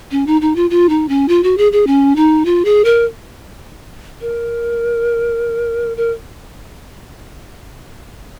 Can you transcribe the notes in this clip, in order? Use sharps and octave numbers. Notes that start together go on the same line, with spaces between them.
C#4
D#4
D#4
F4
F4
D#4
C#4
F4
F#4
G#4
G#4
C#4
D#4
F4
G#4
A#4
A#4
A#4